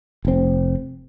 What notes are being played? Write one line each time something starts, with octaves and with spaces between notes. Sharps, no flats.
F1 C4